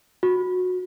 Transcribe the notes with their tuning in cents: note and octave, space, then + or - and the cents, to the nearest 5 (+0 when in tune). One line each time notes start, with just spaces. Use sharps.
F#4 -20